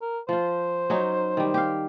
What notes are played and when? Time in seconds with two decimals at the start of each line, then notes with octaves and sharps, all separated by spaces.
0.02 A#4
0.29 F3 F4 C5
0.90 F#3 C#4 D#4
1.37 D#3 G3
1.54 G4 F5